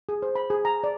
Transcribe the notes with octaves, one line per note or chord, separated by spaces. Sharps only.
G#4
C5
B5
G#4
A#5
D5